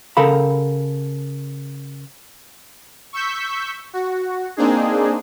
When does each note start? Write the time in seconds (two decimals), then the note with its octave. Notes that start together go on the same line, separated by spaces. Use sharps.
0.17 C#3 A4 A#4 F5 B5
3.13 C#6 E6 G6 B6
3.93 F#4
4.57 A#3 C4 D4 D#4 G#4